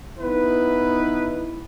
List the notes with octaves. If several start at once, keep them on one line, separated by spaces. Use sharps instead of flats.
B3 D#4 E4 B4